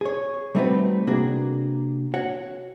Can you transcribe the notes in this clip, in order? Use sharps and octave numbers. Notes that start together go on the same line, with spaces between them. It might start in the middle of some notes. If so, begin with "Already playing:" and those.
G#4 C#5
G3 A3 C4 D#4 F#4 B4
C3 A#3 D4 F#4 G#4
F#4 C#5 F#5